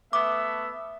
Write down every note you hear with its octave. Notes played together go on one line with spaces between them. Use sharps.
A3 B3 E5 D6